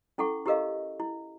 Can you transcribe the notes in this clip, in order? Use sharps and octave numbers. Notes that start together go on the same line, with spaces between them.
C#4 E4 A4 F#5 C#6
E4 G4 A4 A#4 D#5 F5
E4